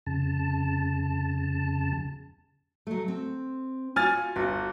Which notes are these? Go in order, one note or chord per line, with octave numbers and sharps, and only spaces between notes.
F2 C#3 A5
F#3 A3
C4
F4 F#4 G#5 F6 A6
G1 F#4